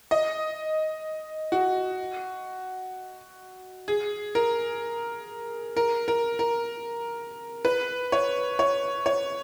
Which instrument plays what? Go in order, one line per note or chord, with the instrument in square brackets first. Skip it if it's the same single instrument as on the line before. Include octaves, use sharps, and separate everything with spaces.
[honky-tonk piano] D#5
F#4
G#4
A#4
A#4
A#4
A#4
B4
C#5
C#5
C#5